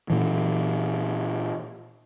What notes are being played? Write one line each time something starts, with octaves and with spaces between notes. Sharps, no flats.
A#2 E3